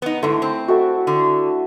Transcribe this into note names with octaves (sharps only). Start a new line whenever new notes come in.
B3 D#4
G#2 D3 A3 E4
C4
F#4 A4 E5
D3